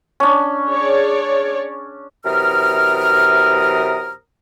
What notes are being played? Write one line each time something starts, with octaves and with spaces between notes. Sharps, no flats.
C#4 D4
G#4 C#5 D5
F#2 C3 E3 A#4 D#6 F6